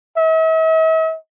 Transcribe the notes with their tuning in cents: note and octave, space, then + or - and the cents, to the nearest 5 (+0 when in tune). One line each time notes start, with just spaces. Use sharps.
E5 -45